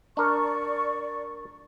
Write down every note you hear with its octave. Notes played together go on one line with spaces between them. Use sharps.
D4 A#4 D5 C#6